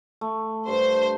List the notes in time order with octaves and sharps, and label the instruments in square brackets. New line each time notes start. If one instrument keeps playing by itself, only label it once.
[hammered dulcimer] A3
[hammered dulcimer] G2 [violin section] C5